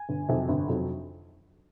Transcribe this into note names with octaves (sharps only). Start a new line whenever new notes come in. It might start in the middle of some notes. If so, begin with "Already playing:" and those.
Already playing: G#5
G1
F2 C3 D#3 F#3
G1
F2 C3 D#3 F#3